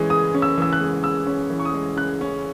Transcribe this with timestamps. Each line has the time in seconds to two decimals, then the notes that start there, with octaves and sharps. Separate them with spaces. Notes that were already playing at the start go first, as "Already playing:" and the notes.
Already playing: C#3 E3 G#3 C#4
0.10 C#3 D#6
0.35 C#4
0.42 E6
0.58 E3 E6
0.73 F#6
0.80 G#3
1.04 C#3 E6
1.27 C#4
1.50 E3
1.59 C#6
1.65 D#6
1.74 G#3
1.97 C#3 F#6
2.21 C#4